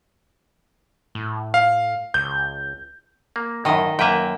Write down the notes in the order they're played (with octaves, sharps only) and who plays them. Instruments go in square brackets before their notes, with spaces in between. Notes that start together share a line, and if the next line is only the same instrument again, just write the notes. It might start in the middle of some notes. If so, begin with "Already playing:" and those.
[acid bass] A2
[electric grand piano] F5
[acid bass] C#2 [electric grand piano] G6
[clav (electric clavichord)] A#3
[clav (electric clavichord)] F#2 A2 [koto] D#3 D#5
[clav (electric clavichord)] F#2 B4 E5 [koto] A#3 G5